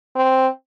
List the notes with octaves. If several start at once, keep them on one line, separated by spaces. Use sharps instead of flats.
C4